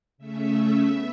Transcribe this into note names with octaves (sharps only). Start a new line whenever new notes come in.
C#3 A3 C#4 E5
B3